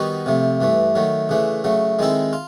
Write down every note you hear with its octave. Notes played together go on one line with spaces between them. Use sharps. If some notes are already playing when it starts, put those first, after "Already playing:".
Already playing: D#3 G3 B3 D#4 F#4
C3 F3 A3
G2 E3 A3
D#3 F#3 A3
C#3 E3 A3 D4
C#3 F#3 A3
D#3 G#3 C4 E4 A4
F4